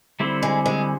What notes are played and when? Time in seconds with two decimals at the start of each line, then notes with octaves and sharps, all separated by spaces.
0.20 D3 G3 C4 E4
0.43 G#3
0.66 G#3